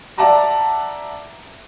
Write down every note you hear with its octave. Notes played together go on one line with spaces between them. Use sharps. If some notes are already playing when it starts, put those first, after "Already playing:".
D5 E5 F#5 A5 A#5 D6